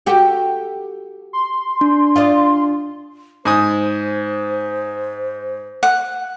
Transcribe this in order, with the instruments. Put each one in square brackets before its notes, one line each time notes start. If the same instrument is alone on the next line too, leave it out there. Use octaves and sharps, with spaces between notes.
[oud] F#4 G4 A4
[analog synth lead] C6
[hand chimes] D4
[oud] F4 D5 D#5
[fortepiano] G#2 G#5 D#6 [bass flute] C5
[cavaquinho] F#5